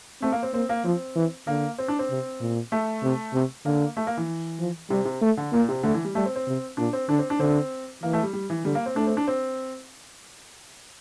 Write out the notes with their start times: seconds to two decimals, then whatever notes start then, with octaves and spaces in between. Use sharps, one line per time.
0.22 A3 C4
0.32 A#3
0.43 C4
0.54 A#3 C4
0.69 A#3
0.84 F3 C4
1.15 E3
1.47 D3 A#3
1.78 C4
1.88 D4
1.99 C4
2.10 C3
2.41 A#2
2.72 A3
3.03 C3
3.34 C3
3.65 D3 A#3
3.97 A3
4.07 A#3
4.17 E3
4.60 F3
4.90 C3 G3
5.05 C3
5.21 A3
5.37 D3
5.53 A#2 A#3
5.69 C3
5.83 D3 A3
5.94 E3
6.05 G3
6.15 G3 A3
6.26 C4
6.36 C4
6.47 C3
6.77 A#2 D4
6.93 C4
7.09 D3 D4
7.19 C4
7.30 D4
7.39 D3 C4
8.03 E3 A#3
8.13 A3
8.23 G3
8.33 G3
8.50 E3
8.65 D3 G3
8.75 A#3
8.86 C4
8.96 A3 D4
9.07 C4
9.17 D4
9.27 C4